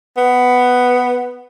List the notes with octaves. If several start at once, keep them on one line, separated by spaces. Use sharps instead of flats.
B3